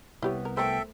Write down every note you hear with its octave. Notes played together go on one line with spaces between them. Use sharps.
C2 B3 E4 G4 C#5
A#4
A3 A4 A#4 C5 E5 G5